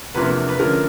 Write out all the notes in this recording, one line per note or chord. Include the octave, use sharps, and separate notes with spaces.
E2 C3 F3 A#3 D4 B4
B4
D3 F3 A3 C#4 A#4